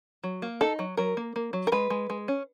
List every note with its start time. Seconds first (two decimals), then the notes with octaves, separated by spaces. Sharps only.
0.24 F#3
0.42 A#3
0.61 D#4 A4
0.79 F#3
0.97 F#3 A#4
1.17 A#3
1.36 A#3
1.53 F#3
1.67 A#4
1.72 G#3 B4
1.90 G#3
2.10 G#3
2.28 C#4